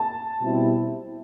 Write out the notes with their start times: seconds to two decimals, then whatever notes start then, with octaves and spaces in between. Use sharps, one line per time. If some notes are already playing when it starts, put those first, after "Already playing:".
Already playing: A5
0.40 B2 G3 C4 E4